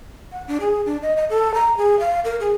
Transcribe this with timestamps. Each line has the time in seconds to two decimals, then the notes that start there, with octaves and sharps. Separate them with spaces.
0.32 F#5
0.48 D4
0.61 G#4
0.86 D4
1.03 D#5
1.16 D#5
1.30 A4
1.54 A#5
1.77 G#4
2.00 F5
2.25 A#4
2.40 G#4